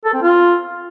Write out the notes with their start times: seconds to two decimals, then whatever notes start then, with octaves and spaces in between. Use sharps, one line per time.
0.05 A4
0.14 C4
0.22 F4